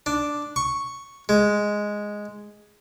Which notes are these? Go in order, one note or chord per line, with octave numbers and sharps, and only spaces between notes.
D4
C#6
G#3